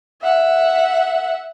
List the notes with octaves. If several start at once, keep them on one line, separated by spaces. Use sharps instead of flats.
E5 F#5